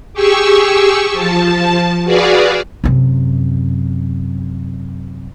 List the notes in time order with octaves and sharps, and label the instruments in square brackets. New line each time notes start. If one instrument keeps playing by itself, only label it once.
[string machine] G4 G#4 C#6 E6
F3 A5
F#4 G#4 B4 D5 F5
[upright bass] F#2 C3